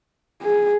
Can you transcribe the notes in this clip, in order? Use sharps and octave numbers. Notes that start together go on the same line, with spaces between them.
G#4